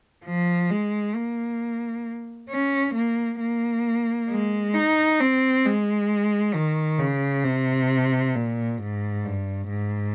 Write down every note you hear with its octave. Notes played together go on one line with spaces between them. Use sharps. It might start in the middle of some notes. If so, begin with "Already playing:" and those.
F3
G#3
A#3
C#4
A#3
A#3
G#3
D#4
C4
G#3
D#3
C#3
C3
A#2
G#2
G2
G#2